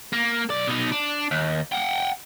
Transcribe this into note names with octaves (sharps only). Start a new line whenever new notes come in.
A#3
B1 D5
B2 D#4
D4
D#2
F#5 G5